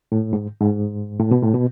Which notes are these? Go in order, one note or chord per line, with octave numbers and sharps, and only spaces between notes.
A2
G#2
G#2
A2
B2
A2
B2